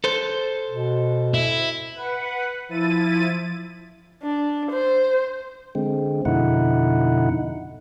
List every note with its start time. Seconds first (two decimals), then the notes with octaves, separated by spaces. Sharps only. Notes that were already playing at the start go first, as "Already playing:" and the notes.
0.04 A4 C5
0.70 B2
1.34 E4
1.94 B4 F#5
2.69 F3 E4 A6 D#7
4.23 D4
4.71 C5
5.75 D3 G#3 C4
6.25 F2 B2 D3 D#4 E4 F#5